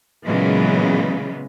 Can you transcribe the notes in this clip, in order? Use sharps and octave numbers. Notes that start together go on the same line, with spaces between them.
A#2 C#3 E3 F#3 G#3 B3